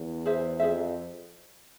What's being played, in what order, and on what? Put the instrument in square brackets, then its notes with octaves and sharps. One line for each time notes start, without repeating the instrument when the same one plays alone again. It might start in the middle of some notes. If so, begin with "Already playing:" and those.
Already playing: [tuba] E2
[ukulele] G#4 C5 E5
[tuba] F2 [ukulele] G#4 C5 E5